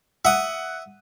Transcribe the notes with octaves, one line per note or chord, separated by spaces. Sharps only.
E5 F#5 D#6